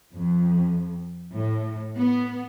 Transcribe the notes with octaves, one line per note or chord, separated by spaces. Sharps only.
F2
A2
B3